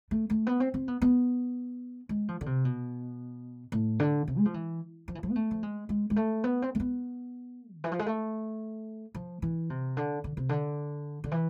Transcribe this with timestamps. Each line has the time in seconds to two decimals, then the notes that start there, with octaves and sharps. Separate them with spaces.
0.11 A3
0.30 A3
0.47 B3
0.60 C4
0.74 C4
0.88 B3
1.02 B3
2.09 G#3
2.28 F3
2.41 D3
2.46 C3
2.65 B2
3.72 A2
4.00 D3
4.27 C3
4.38 G#3
4.45 F3
4.54 E3
5.08 F3
5.15 E3
5.23 F3
5.30 B3
5.36 A3
5.51 F3
5.63 G#3
5.89 G#3
6.10 G#3
6.16 A3
6.44 B3
6.62 C4
6.75 A3
6.80 B3
7.75 D3
7.84 E3
7.92 F3
7.99 G#3
8.06 A3
9.15 F3
9.42 E3
9.70 C3
9.97 D3
10.24 D3
10.37 C3
10.49 D3
11.24 D3
11.31 E3